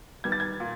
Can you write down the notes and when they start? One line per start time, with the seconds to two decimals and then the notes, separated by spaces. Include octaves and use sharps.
0.24 D#3 G3 B3 G#6
0.32 A6
0.40 G#6
0.60 A#2